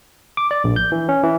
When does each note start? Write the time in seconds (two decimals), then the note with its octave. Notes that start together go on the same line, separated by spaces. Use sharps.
0.37 D6
0.51 D5
0.64 A#1
0.76 G6
0.92 E3
1.09 C#4
1.23 E3